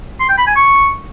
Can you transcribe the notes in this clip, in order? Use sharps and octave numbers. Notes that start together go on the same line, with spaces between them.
C6
G5
B5
G#5
C#6